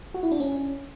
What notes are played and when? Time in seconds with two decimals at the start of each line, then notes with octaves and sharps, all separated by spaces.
0.14 F#4
0.23 E4
0.32 D4
0.40 C#4